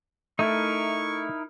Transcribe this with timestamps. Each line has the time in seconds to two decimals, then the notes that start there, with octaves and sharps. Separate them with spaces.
0.39 A3 D#4 E4 A#4 C#6